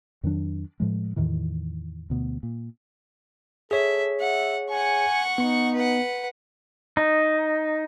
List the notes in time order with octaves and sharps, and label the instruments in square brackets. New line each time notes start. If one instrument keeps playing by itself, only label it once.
[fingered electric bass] F2 D#3 F#3 D4
A2 F3 G#3
E2 A2 D#3 E3
D2 B2
A#2
[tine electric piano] G#4 C#5 [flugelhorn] A4 [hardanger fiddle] E5
[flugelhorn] E5 [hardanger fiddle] F#5
[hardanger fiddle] F#5 C#6 [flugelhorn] G#5
[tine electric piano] B3 [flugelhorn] D#4
[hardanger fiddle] B4 F#5
[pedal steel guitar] D#4